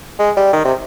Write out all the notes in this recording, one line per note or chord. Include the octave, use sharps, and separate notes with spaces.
G#3
G3
D#3
C3